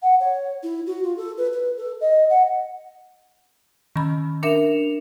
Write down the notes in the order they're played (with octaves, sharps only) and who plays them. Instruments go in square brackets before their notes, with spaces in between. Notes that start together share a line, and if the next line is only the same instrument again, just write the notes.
[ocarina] F#5
C#5
E4
F#4
F4
A4
B4
B4
A4
D#5
F#5
[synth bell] D#3 [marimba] C#4 B5
[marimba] D4 A#4 E5 [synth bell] C#7 E7 F7